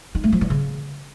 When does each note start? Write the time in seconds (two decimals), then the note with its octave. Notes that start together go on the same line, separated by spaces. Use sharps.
0.15 D#4
0.24 A3
0.32 F3
0.41 E3
0.50 C#3